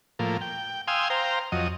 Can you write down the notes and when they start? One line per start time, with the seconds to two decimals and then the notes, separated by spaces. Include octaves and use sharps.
0.19 A2 F3 A#3
0.41 G5
0.88 F5 G5 G#5 C6 D#6 E6
1.10 C5 F5 G5 A#5
1.52 F2 F#3 D#5